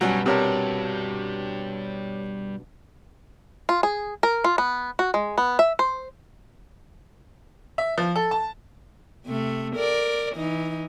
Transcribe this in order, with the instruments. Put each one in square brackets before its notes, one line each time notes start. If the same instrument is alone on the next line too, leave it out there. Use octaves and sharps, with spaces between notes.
[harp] G2 B2 [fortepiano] F#3 C#4 [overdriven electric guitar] G3
[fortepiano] C3 A#4 [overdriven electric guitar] G3 D4 [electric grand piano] G4 C#5 A5
[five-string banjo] F4
G#4
A#4
F4
B3
F#4
G#3
B3
E5
C5
[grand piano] E5
F3
A4
A5
[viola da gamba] C3 A3
A#4 D5
E3 D#4